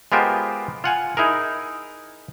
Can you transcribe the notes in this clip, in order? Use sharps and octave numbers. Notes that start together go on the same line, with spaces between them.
G#3 B3 F4 G4 A#4 C5
F4 F#5 G#5
D#4 E4 G#4 A#4